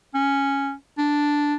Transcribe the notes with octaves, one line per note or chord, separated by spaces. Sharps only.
C#4
D4